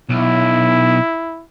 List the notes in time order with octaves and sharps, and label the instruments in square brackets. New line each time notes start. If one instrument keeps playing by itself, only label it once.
[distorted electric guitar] B1 [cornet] E4